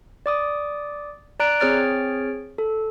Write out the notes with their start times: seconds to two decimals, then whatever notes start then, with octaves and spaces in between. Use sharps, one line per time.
0.26 D5 D6 D#6
1.40 D5 A#5 F#6 D7
1.60 C4 G#4 C#5 F6 A6 D7
2.58 A4